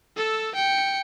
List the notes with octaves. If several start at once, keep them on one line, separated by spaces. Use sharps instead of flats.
A4 E6
G5 C#7